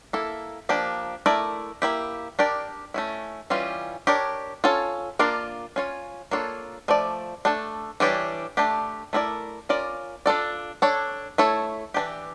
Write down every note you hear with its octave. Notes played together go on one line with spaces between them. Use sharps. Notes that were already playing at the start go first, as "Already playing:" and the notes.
A#3 E4 A4
F3 A#3 D4 G4
A3 E4 A#4 D5
A#3 E4 G4
D4 G4 A#4 D5
A3 C#4 E4
E3 G3 C#4 F4
D4 G4 A#4 C#5
C#4 F4 A4 C#5
A#3 D4 F4 A#4 D5
C#4 F4 C#5
A#3 D4 F4 A4 C#5
F3 A3 D5
A3 D4 A4
E3 G3 D4 G4 C#5
A3 D4 G4
A3 E4 A#4 D5
C#4 F4 A#4 D5
D4 F4 A4 D5
D4 A4 C#5
A3 E4 A4 C#5
E3 A3 D4 G4